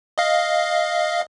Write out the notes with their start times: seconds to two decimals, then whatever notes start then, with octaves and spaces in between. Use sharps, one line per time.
0.18 D#5 F5